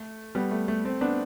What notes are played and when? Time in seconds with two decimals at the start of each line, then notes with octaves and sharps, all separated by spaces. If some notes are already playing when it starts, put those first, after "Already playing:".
Already playing: A3
0.35 G3 B3
0.51 A3
0.68 A3
0.85 A3 C4
1.01 B3 D4